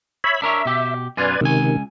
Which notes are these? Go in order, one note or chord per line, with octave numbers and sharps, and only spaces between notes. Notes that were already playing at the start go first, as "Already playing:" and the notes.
C#5 E5 B5
D4 A#4 C#5 E5
B2 G4
B1 F#2 F4 B4 D5 G#5
C#2 C3 D#3 G#5